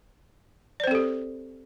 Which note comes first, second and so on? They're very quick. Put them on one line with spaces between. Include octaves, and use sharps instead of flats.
D5 C5 C4 A4 G4